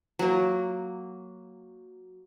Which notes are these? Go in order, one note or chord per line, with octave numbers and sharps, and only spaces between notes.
F#3 A#3